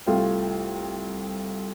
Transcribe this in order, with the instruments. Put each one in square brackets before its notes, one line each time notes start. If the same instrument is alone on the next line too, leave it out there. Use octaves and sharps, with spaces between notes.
[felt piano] C2 A3 F4 F5 G5